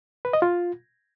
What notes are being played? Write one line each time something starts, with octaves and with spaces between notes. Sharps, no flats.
B4
D#5
F4